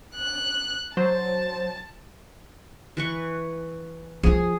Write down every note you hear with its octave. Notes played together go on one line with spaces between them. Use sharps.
F#6
F#3 C5 A5
E3 B4 C#6
F3 F4 G#4